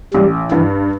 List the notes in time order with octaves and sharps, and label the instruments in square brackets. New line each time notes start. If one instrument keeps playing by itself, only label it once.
[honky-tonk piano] A1 [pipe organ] G3
[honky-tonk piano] G2 [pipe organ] E3